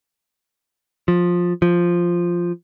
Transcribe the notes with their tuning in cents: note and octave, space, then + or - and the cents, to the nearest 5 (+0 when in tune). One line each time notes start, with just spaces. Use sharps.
F3 +15
F3 +0